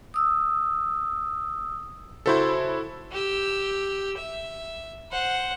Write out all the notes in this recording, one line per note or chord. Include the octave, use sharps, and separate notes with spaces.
D#6 E6
C#3 E4 F#4 A4 C5
G4 E6
E5
C5 F#5